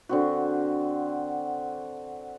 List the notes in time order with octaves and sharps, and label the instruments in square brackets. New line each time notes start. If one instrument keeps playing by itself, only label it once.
[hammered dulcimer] D3 C4 F#4